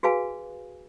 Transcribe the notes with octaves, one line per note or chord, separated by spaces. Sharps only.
F#4 G#4 B4 F5 G#5